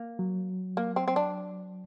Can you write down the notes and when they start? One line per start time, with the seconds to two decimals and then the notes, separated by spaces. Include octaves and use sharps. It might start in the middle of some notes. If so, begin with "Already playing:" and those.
Already playing: A#3
0.19 F#3
0.77 A#3
0.96 C4
1.08 C4
1.16 D4